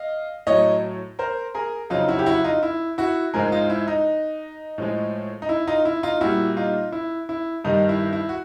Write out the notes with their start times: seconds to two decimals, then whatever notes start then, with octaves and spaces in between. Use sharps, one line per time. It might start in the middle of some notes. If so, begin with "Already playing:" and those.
Already playing: D#5 F5
0.47 A2 F#3 C#5 D#5
1.19 A#4 C5
1.54 G#4 A#4
1.90 F2 C#3 F#3 D#4 F4
2.08 E4 F#4
2.19 G4
2.26 E4 F#4
2.44 D#4 F4
2.63 E4
2.98 E4 F#4
3.34 G#2 F3 G#3 G#4 A#4
3.52 D#4 F4
3.70 E4
3.88 D#4
4.78 A2 F3 G#3
5.42 D#4
5.49 E4
5.67 D#4 F4
5.85 E4
6.03 D#4 F4
6.21 A#2 G3 E4 F#4
6.57 D#4 F4
6.92 E4
7.29 E4
7.65 G2 D#3 G3 D#4
7.89 E4
8.13 E4
8.29 F#4